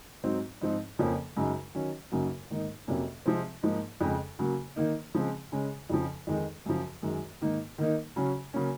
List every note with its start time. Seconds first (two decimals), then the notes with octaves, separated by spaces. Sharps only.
0.23 G#2 F#3 C4 D#4
0.61 G#2 F3 C4 D#4
0.99 F2 C#3 F3 A#3 C#4
1.37 F#2 C#3 G#3 D#4
1.75 D#3 F#3 C#4
2.11 F#2 C#3 F#3 A#3 D#4
2.50 G#2 D#3 A#3 D#4
2.87 F2 C3 F#3 A#3 C#4
3.26 C3 F3 G#3 C4
3.63 G#2 F3 A#3 D#4
4.01 F2 C#3 G#3
4.39 C#3 F#3 A#3
4.76 D#3 A#3 D#4
5.15 C#3 F3 G#3 C4
5.52 C#3 G#3 C#4
5.90 F2 C#3 F3
6.27 F2 D#3 G#3 D#4
6.66 F#2 C#3 F3
7.03 F#2 D#3 G#3
7.41 G#2 D#3 A#3 D#4
7.78 D#3 A#3 D#4
8.16 C#3 F#3 C#4
8.54 C#3 F#3 A#3 C#4